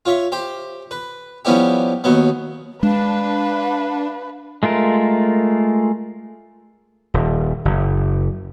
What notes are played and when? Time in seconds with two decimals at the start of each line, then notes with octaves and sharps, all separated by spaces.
0.05 F4 C#5 E5
0.32 G4 C5
0.91 B4
1.45 F3 G3 B3 C#4 E4 G4
2.04 D#2 F#3 B3
2.83 G#3 D4 B4 F5
4.63 G#3 A3 F4 A#4
7.14 D#1
7.65 F#1